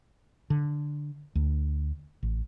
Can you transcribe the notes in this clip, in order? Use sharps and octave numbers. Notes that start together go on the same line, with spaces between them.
D3
D2
A1